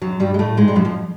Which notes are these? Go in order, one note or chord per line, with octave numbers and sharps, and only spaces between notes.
F#2 F#3
G2 G3
G#3
A2 A3
G#2 G#3
G3
F#2 F#3
F2 F3